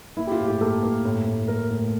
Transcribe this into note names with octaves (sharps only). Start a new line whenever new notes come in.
A#3 E4
G4
F4
A2
G4
A#3 A4
A#3
A2
A2
A#3 A#4
A2